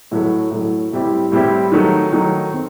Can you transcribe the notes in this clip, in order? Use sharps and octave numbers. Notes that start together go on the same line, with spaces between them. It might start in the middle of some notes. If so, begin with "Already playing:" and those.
A2 F#3 A3
A2 F#3 A3
A2 G3 C4 E4 G4
A2 G3 C4 E4 G4
D#3 F#3 A3 D#4
D#3 F#3 A3 D#4
C4